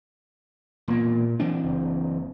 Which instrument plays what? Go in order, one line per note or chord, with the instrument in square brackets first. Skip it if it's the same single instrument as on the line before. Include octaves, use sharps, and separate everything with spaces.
[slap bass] E1 A#3 [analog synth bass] A#2
[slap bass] E3 C4 D4
[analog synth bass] F#1